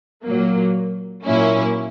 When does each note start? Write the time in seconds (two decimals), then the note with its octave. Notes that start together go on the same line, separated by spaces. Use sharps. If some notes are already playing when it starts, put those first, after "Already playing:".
0.24 A#2 F#3 A#3
1.25 A#2 F#3 A#3 C#4 E4